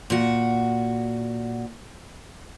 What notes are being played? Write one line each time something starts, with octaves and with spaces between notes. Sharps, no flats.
A#2 F#4